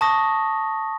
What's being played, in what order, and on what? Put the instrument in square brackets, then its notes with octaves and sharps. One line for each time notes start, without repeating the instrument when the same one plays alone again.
[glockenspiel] A5 C#6 D#6 A#6